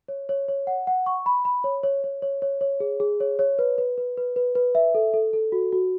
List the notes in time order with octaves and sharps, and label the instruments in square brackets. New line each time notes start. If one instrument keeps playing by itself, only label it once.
[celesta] C#5
C#5
C#5
F#5
F#5
C#6
B5
B5
C#5
C#5
C#5
C#5
C#5
C#5
G#4
G#4
C#5
C#5
B4
B4
B4
B4
B4
B4
E5
A4
A4
A4
F#4
F#4